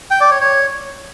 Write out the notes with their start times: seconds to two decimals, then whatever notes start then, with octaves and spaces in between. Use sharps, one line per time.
0.11 G5
0.21 D5
0.31 C#5
0.41 C#5